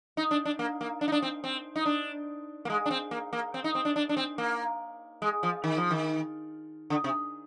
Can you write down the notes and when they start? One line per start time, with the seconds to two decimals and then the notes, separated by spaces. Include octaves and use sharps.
0.17 D#4
0.31 D4
0.45 D4
0.59 A#3
0.81 A#3
1.01 D4
1.08 D#4
1.12 D4
1.22 C4
1.44 C4
1.76 D#4
1.86 D4
2.65 A#3
2.70 G#3
2.86 D4
2.91 C4
3.11 A#3
3.33 A#3
3.54 C4
3.64 D#4
3.75 C4
3.85 D4
3.96 D4
4.09 D4
4.17 C4
4.38 A#3
5.22 G#3
5.43 F3
5.64 D#3
5.78 F3
5.91 D#3
6.90 D3
7.04 C3